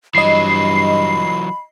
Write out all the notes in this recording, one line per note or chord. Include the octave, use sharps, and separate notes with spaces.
G2 E3 F#3 D#5 B5 C7